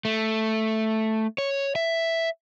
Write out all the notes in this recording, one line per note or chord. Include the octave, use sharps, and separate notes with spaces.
A3
C#5
E5